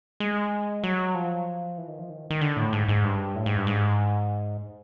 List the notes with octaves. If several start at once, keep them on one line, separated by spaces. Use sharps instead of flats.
G#3
F#3
F3
E3
D#3
F3
D#3
D#3
D3
A2
G#2
G#2
G2
A2
G#2
G2
G#2